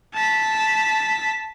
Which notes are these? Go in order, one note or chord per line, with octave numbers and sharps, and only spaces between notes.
A5 B6